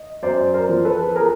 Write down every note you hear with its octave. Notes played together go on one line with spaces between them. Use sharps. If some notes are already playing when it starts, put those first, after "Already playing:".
Already playing: D#5
F#2 C5 D5
A#4 C5
F3
A4 B4
G#4 A#4